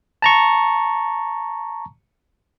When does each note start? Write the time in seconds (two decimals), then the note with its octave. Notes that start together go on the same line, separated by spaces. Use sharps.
0.22 A5 A#5 C#6